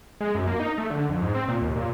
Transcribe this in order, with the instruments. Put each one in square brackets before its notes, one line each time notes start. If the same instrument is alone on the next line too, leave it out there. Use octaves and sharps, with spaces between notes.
[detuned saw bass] G#3
F#2
A#3
D#4
A3
D3
F2
G#2
C4
A#2
D#2
A#2